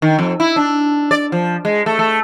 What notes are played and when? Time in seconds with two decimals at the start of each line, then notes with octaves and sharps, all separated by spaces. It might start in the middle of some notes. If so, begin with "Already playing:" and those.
0.02 D#3
0.19 F2
0.40 E4
0.56 D4
1.11 D5
1.32 F3
1.65 G#3
1.86 A3
1.99 A3